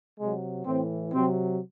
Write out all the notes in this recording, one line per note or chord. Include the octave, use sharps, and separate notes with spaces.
C3 F#3 G#3
A2 E3 C4
C3 F#3 C4